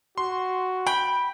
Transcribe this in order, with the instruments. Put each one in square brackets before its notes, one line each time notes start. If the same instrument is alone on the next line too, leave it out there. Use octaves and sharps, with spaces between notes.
[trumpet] F#4 [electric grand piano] C6
[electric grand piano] G5 G6 [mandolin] B5